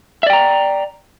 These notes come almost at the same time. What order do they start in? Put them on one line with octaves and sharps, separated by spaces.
E5 D5 G5 A#5